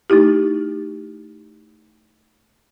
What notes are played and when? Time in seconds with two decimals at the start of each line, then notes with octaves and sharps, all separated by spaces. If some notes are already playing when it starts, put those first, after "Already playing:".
0.10 A3 D#4 E4 G4